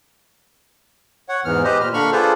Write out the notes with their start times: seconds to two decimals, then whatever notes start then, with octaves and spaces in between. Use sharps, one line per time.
1.29 C#5 F#5
1.45 E2 G#2 E3 B3 F6
1.64 G4 B4 C5 D#5
1.80 A#2 F6
1.94 D3 A#3 D4 B5 C#6 F6
2.12 F4 G#4 A4 B4 C5 D5